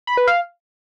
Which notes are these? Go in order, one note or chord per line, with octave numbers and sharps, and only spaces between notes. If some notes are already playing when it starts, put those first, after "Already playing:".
B5
B4
F5